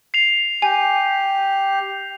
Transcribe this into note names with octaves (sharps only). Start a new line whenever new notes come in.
C7 F7
G4 G#5